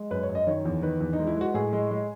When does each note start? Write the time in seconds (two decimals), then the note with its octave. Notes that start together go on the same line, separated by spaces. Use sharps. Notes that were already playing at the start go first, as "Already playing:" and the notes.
Already playing: G#3
0.11 F#2 B4
0.23 C#5
0.29 F#2
0.35 D#5
0.47 D#3 C#5
0.65 E2
0.82 D#3 B4
1.01 E2
1.13 D#4
1.19 G#3
1.27 E4
1.36 G#3 F#4
1.54 A2 G#4
1.73 G#3
1.91 G#3